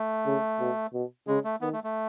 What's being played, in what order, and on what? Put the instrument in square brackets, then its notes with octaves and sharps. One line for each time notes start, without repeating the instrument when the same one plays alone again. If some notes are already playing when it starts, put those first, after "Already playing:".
Already playing: [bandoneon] A3
[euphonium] C#3
B2
B2
[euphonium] C#3 [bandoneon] G#3
[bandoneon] A3
[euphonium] D#3 [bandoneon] B3
[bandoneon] A3
A3